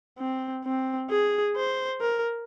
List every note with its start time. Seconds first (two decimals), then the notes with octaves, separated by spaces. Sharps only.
0.19 C4
0.64 C4
1.10 G#4
1.56 C5
2.01 A#4